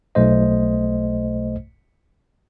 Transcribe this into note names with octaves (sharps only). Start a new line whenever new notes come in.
B1 A3 C5 D#5